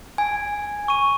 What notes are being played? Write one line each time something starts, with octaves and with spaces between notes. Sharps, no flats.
G#5
C#6 D#7